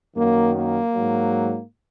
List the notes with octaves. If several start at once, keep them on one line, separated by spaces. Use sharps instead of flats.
F#2 D#3 F#3 A#3
A#3
G#2 F#3